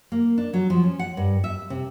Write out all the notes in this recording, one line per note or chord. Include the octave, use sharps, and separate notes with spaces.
A#3
D4
F#3
F3
C#4
F#5
G2
E5
C3